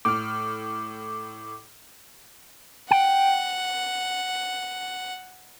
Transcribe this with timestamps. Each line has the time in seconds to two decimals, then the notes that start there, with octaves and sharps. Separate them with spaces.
0.05 A2 D6 F6
2.91 F#5 G5